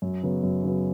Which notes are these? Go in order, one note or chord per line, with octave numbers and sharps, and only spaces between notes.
F#2
C#3 F#3 B3
F#2
C#3 F#3 B3